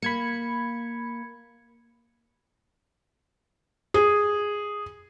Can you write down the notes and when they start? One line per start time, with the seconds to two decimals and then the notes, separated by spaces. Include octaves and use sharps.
0.02 A#3 B5 G#6 C#7
3.94 G#4